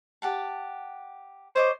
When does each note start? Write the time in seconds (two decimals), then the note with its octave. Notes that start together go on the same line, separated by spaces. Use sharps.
0.22 G4 F#5 A5
1.56 C5 C#5 D#5 D6